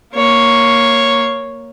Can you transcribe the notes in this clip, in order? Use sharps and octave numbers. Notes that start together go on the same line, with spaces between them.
A#3 C#5